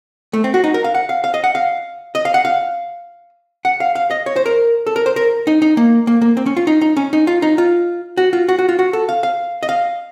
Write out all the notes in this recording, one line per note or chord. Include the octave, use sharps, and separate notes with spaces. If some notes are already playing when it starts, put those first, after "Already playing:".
A3
C4
F#4
D#4
A#4
F5
F#5
F5
F5
D#5
F#5
F5
D#5
F5
F#5
F5
F#5
F5
F5
D#5
C#5
C5
A#4
A4
A#4
C5
A#4
D#4
D#4
A#3
A#3
A#3
C4
C#4
F4
D#4
D#4
C#4
D#4
F4
D#4
F4
F#4
F4
F#4
F#4
F4
F#4
A4
F5
F5
D#5
F5